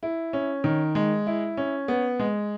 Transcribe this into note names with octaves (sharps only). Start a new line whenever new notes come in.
E4
C#4
D#3
G#3
E4
C#4
B3
G#3